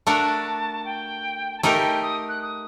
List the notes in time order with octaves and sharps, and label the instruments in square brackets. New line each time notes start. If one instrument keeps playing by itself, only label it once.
[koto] A3 D4 F#4 A#4 [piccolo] A5
[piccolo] G5
A5
[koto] A3 D#4 G4 A#4 [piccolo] G5
[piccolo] D#6
F#6
D#6